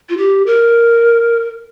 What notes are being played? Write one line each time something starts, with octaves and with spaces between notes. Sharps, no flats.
F4
G4
A#4